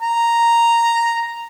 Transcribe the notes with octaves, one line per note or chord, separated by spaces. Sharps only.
A#5